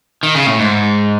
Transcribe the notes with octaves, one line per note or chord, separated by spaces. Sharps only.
D#3
C#3
A2
G#2